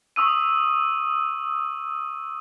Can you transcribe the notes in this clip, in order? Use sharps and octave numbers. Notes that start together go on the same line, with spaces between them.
C#6 D#6 E6 D#7